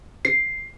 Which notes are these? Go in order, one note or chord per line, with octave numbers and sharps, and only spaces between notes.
C7